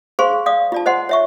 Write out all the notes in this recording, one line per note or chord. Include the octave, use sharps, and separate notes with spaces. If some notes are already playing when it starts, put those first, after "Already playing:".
G#4 C5 F5 C6 C#6
D5 F5 D#6
F4 D5 A5
C5 D#5 F#5 C6
C#5 E5 C#6